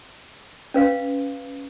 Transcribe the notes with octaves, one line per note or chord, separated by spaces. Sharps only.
C#4 B4 F5